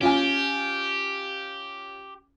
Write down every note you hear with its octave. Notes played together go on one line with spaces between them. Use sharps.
C#4 F4 G4 G#5